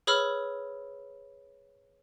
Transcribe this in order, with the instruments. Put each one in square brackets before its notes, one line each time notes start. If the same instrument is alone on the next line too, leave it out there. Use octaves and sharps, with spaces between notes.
[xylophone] G#4 B4 C#5 B5 E6 F6